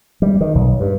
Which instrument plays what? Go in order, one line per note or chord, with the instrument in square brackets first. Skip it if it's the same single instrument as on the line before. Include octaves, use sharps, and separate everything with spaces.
[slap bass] G3
D#3
B1
G2